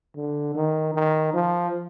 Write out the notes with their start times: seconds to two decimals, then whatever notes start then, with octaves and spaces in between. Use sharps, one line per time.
0.16 D3
0.55 D#3
0.94 D#3
1.33 F3